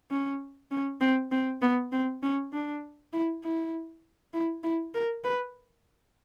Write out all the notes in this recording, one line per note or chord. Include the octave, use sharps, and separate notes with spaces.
C#4
C#4
C4
C4
B3
C4
C#4
D4
E4
E4
E4
E4
A#4
B4